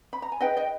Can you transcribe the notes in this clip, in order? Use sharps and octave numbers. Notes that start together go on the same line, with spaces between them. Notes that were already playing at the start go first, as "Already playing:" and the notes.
B5
A#5
G#5
D#4 G#4 B4 D#5 G5
D#5 G5